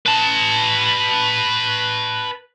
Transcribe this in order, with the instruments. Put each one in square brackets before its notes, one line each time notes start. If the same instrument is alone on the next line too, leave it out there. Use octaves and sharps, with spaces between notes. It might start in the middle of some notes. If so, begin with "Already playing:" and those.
[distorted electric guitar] B4 A5